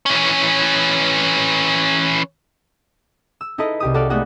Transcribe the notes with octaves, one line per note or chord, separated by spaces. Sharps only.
E3 C#4
E6
D#4 E4 A4 B4 D#5
C2 G4 D#6
F#4 A4 D5 F5
G#3 A3 B3 D#4 F#4 F#5